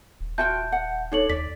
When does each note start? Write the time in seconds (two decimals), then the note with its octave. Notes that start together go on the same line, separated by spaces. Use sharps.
0.20 D#1
0.38 F4 F#4 E5 G5 A5 G6
0.72 F#5
1.12 D4 D#4 A4 C#5 F#7
1.30 D#2 D5 B6